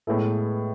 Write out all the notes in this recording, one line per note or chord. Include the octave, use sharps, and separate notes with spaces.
A2 G#3 B3 E4 A4